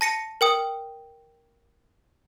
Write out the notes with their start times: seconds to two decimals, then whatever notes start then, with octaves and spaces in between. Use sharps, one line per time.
0.01 A5 A#6 C#7 D#7
0.41 A#4 G5 D#6